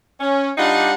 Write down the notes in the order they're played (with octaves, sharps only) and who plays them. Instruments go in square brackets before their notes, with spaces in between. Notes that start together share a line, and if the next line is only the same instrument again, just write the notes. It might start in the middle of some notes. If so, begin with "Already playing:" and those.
[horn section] C#4
G3 D4 D#4 F4 F#5